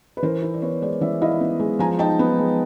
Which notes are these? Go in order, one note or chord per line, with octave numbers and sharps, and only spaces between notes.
B4
E3 A#4 C5
E4
D5
B3 B4 C#5
G#3 C5 D5
E3 D5 E5
E4 D#5 F5
B3
G#3
F3 G#5 A#5
D#4 G5 A5
B3
G#3